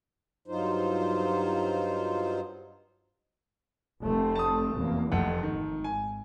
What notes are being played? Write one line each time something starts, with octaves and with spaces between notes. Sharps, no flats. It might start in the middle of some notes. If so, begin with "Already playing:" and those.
G2 F#3 D#4 F4 C5
F1 A3 C4
A5 D#6
F1 E2 A#3
F1 F2 A3 F#5
G#1 D#3
G#5